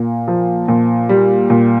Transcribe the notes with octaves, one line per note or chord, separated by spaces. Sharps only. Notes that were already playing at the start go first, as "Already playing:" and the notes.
Already playing: A#2
F3
A#2
G3
A#2